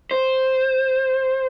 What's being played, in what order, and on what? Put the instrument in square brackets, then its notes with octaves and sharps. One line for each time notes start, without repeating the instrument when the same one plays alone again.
[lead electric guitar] C5